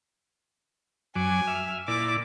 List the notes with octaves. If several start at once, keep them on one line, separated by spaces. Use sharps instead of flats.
F#2 F#3 G#5 D6
E5 F6
A#2 E4 D5 D6